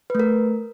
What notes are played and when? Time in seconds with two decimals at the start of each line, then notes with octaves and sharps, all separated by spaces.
0.10 B4
0.15 A3
0.20 A#4